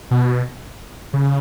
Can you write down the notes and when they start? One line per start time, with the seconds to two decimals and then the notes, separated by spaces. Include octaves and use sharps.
0.11 B2
1.13 C#3